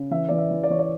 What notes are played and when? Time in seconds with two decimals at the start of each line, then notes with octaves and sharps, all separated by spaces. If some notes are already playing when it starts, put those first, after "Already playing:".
Already playing: C#3
0.11 E3 E5
0.29 E3 D5
0.38 E5
0.51 E3
0.63 D5
0.70 E3 C#5
0.79 D5